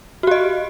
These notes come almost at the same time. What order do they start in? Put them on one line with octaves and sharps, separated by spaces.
F#4 G4 D#5